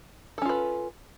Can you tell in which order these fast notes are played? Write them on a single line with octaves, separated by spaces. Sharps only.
A4 C#4 F4 B4